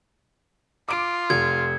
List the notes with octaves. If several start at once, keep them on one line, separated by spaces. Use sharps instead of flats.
F4 D6 D7
F1 G#6